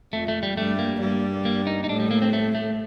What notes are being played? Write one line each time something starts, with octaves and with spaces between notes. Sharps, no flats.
F2 F3 A3
A3
G3
G2 G3 A3
A#3
G2 G3
A#3
D#4
D#4
A2 D4
G3
A#3
C4
A3
A3